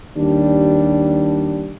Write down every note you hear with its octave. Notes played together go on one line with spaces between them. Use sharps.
D#2 G3 D4